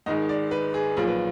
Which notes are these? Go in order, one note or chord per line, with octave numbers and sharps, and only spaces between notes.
G#1 G#2 D#3 G#3 D#5
D5
B4
G#4
B1 A#2 F3 G#4
B4